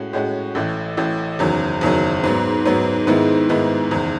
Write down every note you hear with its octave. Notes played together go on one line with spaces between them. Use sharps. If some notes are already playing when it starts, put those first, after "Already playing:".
Already playing: A2 G#3 C#4 F#4
A2 G#3 C#4 F#4
A1 A2 E3
A1 A2 E3
F#1 E2 D#3 F#3
F#1 E2 D#3 F#3
G#2 F#3 B3
G#2 F#3 B3
G#2 D#3 G#3 B3 E4
G#2 D#3 G#3 B3 E4
F#1 E2 D#3